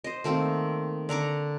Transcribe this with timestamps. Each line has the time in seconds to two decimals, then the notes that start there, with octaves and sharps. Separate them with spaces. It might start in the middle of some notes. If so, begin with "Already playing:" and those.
0.04 C5 D#5
0.24 D#3 A3 A#3 C4
1.09 D3 A#5 C#6 D6